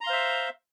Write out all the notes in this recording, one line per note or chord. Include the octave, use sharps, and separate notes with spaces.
C5 E5 F5 A#5 C6